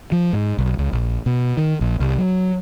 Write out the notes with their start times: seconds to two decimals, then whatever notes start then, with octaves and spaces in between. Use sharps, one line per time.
0.12 F3
0.33 G#2
0.59 B1
0.79 C#2
0.93 A#1
1.26 B2
1.57 D#3
1.81 A#1
2.00 C2
2.18 F#3